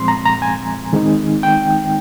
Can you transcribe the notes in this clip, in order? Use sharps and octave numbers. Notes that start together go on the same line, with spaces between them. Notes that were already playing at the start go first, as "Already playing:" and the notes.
Already playing: A#2 F3 G#3 C4 C6
A#5
A#5
G#5
D#3 G#3 C4 D#4
G5